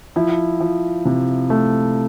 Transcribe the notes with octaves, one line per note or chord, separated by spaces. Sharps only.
F3 E4
F3
C3
A3